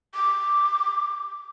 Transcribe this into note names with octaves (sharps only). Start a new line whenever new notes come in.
D6